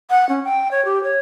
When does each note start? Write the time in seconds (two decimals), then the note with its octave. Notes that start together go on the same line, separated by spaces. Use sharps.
0.10 F#5
0.29 C#4
0.44 G5
0.71 C#5
0.85 G4
1.03 C#5